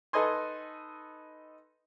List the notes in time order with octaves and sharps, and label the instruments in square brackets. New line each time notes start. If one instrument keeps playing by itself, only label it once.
[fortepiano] D#4 A4 B4 D#5 G#5 C6